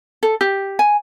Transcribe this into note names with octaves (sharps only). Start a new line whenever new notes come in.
A4
G4
G#5